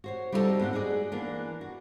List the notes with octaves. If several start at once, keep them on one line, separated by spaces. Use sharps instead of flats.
F#4 C5 C#5
G3 C4 D#4 E4 F#4 A4
G#2 B3 C4 F#5
D#4 F#4 G#4 D5
E3 A#3 B3 D4
F#4